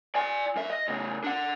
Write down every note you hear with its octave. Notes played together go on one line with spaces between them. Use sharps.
D5 G#5
F#2 E5
D#5
A2 C#3
D4 F#5